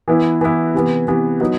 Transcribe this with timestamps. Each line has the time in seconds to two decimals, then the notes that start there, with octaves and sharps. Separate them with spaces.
0.08 E3 B3 E4
0.41 E3 B3 E4
0.74 C3 E3 B3
1.08 C3 E3 B3
1.40 F#3 B3 D#4